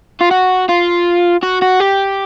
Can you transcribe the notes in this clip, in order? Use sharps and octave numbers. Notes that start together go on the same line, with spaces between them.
F4
F#4
F4
F#4
F#4
G4